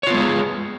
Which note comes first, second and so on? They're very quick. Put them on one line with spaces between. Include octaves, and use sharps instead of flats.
C#5 F4 B3 G#3 G#4